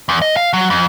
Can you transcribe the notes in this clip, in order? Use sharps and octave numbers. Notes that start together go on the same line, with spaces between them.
E2
D#5
F5
F#3
F2